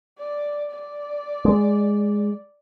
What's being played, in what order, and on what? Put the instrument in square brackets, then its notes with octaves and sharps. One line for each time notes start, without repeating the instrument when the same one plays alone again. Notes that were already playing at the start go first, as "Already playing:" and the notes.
[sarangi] D5
D5
[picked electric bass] G#3